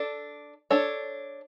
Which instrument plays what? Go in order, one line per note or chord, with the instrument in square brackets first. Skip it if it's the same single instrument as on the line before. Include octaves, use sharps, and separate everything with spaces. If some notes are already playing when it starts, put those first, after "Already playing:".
Already playing: [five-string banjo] D4 A4
D4 A4 C#5